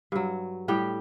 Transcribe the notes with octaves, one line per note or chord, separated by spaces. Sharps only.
G2 F#3
A2 G3 G4 G5